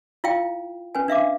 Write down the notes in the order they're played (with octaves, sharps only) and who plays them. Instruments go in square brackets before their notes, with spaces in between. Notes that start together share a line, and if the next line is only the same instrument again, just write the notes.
[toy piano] E4 F4 F5 G5
C#4 B4 G#5
D4 E5 F5 D6